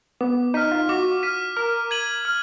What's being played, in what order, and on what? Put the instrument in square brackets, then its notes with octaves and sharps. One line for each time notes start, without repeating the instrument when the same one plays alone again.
[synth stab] B3 [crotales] D6
[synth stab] D#4 [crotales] F6 B6 D#7
[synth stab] F4
[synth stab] F#4 [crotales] D6
[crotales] F6 B6 D#7
[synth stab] A#4 [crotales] F6
[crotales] G#6 D#7 F#7
F6